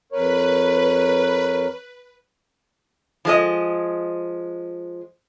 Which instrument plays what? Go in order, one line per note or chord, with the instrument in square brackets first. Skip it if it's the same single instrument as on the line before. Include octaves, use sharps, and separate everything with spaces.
[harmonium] F2 A#4 C#5 [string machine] B4
[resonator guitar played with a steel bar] F3 G#3 D#5